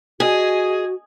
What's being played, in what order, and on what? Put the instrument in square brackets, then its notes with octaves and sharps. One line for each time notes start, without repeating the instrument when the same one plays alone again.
[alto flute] F#4 [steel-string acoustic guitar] G#4 [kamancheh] D#5 G#5